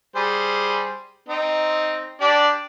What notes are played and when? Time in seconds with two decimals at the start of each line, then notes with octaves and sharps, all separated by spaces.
0.15 G3 G#4 C5
1.29 C4 D#4
2.21 D4 G4 D5